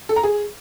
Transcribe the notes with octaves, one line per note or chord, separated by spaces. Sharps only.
A4
A#5
G#4